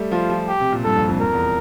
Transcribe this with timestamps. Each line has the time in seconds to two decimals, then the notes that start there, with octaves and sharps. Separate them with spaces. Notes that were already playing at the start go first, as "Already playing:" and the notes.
Already playing: G3 A3
0.11 F3 F4
0.30 F3
0.48 G4
0.60 C3
0.72 A#2
0.84 G2 A4
0.96 F2
1.08 F2
1.21 F2 A#4
1.33 E2